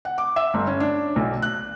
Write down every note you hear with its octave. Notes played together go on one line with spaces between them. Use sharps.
F#5
D6
E5
G1
C#4
D4
B1
F#6